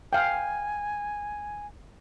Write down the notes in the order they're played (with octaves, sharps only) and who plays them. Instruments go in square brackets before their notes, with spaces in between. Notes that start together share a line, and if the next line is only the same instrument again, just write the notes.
[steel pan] F5 G5 [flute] G#5